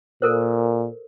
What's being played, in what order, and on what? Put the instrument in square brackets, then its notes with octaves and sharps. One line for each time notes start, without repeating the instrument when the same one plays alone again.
[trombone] A#2 [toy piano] A4 A#4 C5